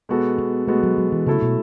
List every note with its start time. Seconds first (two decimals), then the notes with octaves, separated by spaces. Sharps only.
0.09 B2 G#3 B3 F#4 A4
0.38 B3
0.67 B2 G#3 A3 B3 F#4 A4
0.83 F#3
0.98 F#3
1.12 E3
1.26 C#3 F#3 A3 E4 A4
1.42 B2